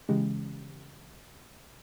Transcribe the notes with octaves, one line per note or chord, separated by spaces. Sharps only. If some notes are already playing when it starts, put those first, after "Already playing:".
C#3 E3 G#3 G4